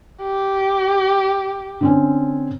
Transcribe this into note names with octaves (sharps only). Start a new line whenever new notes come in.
G4
D3 C4 C#4